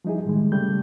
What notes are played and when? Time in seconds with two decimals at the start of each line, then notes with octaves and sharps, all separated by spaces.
0.05 F3 G3 D#4 E4 G#4
0.25 A2 D#3 G3 G#3
0.52 C#3 G3 A3 G6